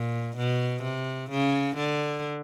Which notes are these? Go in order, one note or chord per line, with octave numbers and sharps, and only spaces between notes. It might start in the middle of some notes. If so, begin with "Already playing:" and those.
Already playing: A#2
B2
C3
C#3
D3